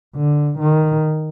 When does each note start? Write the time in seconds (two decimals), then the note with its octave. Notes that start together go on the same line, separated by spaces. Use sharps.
0.16 D3
0.59 D#3